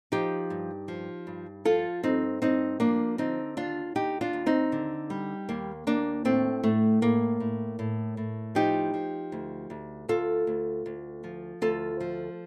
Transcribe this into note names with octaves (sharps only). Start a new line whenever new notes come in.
F3 D#4 G4
G2
F3
G2
F3 F4 A4
G2 C4 D#4
G2 C4 D#4
F3 A#3 D4
D3 C4 D#4
D#2 D4 F4
D#2 D#4 G4
D4 F4
D#2
C4 D#4
D3
G3
D#2 A#3
D#2 A#3 D4
A2 A3 C4
A2 A3
A2 A#3
A2
A2
A2
F3 D#4 G4
F3
D2
D2
D2 F4 A4
D2
D2
F3
D2 F4 A4
F3